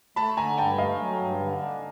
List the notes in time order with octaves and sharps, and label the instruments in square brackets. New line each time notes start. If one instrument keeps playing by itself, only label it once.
[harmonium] A3 [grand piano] A5 B5
[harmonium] D3 [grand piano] G#5 A#5
[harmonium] G2 [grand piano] G5 A5
[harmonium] A3 [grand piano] D#5 F5
[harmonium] F#3
G2
D3
D4